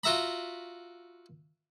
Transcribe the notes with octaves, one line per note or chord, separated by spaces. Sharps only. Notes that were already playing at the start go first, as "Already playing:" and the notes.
F4 F#4 E5 A#5 B5